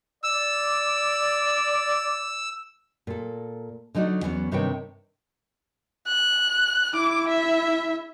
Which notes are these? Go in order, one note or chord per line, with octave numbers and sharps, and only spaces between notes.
D5 E6
A#2 A4
D3 F#3 D#4 F#4 D5
E2 F#3 B3 C#4
G2 C3 D#3 B4 C#5 G5
F#6
E4 D6
E5